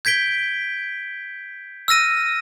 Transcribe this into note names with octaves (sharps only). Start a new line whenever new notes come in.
G6 G#6 B6 D7 G7
E6 F6 A#6 D#7